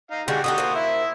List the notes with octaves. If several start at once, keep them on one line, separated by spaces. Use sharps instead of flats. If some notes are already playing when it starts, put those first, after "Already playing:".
D#4 F5
D3 G3 G#3 F#4 G5
D3 D#4 F#4 G4 D#6
A#3 C5
E4 E5